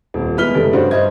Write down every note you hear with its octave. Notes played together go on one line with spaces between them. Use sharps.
D#1 F2
E2 G#3 B4 F6 B6 G7
F1 C#3 E3 G3
G2 C#3 D4 F#4 C5
G2 C5 D#5 G#6